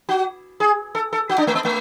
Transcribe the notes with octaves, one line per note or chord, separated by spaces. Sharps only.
F#4
G#4
A4
A4
F#4
D4
A3
B3
A3